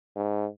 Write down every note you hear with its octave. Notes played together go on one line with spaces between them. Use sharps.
G#2